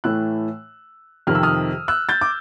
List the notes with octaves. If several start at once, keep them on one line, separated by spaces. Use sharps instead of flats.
A2 E3 A3 E6 F#6
F2 C3 D#3 F6
E6
D#6 F6
E6 F#6
G6 A6
D6